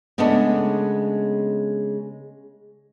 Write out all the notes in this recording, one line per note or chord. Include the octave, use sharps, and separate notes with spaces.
C#3 G#3 A3 B3 C#4 D4